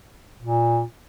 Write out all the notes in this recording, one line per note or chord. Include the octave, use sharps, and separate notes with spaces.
A#2